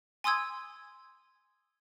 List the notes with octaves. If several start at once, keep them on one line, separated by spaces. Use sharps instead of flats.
G#5 C6 D#6 E6 G#6